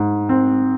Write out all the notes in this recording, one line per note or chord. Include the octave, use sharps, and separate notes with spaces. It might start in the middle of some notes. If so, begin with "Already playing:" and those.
Already playing: G#2
C4